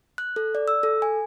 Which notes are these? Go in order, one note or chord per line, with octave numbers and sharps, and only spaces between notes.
F#6
A4
D5
E6
A4
G#5